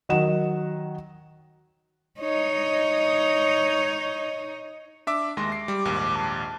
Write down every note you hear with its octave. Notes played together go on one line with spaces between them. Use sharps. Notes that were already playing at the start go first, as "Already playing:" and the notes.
D#3 F#3 D#5 F#5 E7
D#4 C#5 D#5
D4 E5 D6
D#2 G#3 C6 A#6
D6 C7
G3
A#1 D#2 G#2
A5